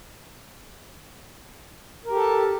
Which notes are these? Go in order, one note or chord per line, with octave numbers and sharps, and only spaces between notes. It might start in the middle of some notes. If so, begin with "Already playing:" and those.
G4 A4 A#4 A5